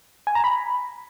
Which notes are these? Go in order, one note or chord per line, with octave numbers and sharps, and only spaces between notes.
G#5
A#5
B5